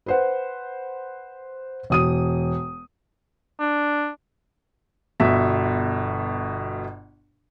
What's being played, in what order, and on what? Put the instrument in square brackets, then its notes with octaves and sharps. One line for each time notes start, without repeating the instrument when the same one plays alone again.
[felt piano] B4 C5 F#5
E1 D#6 D#7
[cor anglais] D4
[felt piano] G1 B2 E5